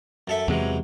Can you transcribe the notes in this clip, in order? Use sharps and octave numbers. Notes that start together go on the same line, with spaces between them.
F#2 A4 E5
E2 C3 E3 F#3 G#3